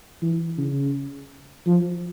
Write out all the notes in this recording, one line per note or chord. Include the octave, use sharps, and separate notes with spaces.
E3
C#3
F3